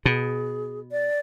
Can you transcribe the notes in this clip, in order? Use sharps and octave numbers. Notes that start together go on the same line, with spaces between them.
B2 G#4
D5